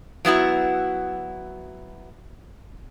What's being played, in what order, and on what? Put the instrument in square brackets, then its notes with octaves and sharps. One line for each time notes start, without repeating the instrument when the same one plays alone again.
[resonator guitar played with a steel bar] F#3 B3 E4 F#4